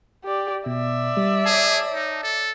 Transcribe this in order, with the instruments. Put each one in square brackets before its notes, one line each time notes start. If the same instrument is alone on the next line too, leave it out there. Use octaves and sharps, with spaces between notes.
[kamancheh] G4 D5
[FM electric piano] B2 [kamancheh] D5 E5
[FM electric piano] G3
[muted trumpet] G#4 [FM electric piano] C#5 A5
[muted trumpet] D#4
A4